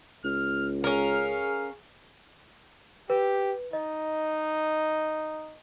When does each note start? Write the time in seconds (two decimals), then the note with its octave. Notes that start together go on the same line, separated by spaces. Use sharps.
0.24 C#2 F6
0.84 C#4 G#4 A#4 F5
3.10 G4 B4
3.73 D#4 D#5